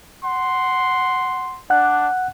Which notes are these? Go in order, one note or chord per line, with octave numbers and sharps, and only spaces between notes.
F#5 C6
D4 F#5 F#6